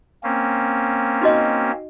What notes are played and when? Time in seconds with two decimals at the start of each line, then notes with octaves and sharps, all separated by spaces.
0.23 A#3 C4 C#4
1.21 D#4 F#4 D#5